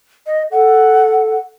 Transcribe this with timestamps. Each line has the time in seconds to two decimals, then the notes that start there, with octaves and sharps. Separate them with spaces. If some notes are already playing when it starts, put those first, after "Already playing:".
0.27 D#5
0.52 A4 F#5